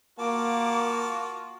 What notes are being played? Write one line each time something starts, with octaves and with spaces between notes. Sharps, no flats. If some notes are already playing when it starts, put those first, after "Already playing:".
A#3 F4 F#4 A5 D6